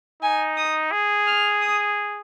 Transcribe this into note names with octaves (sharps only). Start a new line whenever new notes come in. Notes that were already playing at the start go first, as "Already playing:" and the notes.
D#4 G#5
D#6
G#4
F6
D#6